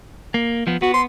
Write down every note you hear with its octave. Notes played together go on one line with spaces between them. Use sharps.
A#3
F3 B3
B3 F#4
C6